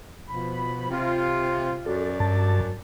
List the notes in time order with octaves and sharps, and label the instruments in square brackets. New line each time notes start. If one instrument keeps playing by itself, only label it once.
[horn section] B2 F3 B5
C3 F4
[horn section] F#2 F#3 D5 [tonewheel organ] A4
[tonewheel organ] G2 A5